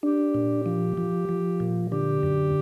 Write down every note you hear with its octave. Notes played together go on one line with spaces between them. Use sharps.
D4 G4
A#2
F3
F3
F3
A#2
D3 G4
F#2